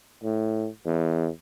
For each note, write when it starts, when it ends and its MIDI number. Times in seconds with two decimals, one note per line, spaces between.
0.24 0.68 45
0.86 1.28 40